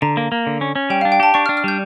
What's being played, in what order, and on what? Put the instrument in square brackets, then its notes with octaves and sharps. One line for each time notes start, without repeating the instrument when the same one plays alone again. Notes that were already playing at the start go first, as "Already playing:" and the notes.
[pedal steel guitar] D3 [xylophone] A#5
[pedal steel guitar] A#3
A#3
D3
C#4
C#4
[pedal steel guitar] G3 [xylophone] G5
[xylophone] F5
[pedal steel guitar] D4
[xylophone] G5
[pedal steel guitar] G4 [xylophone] A5
[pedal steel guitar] D4 [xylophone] C#6
[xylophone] F6
[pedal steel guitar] D4
[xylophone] F6
[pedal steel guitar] G3 [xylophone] G6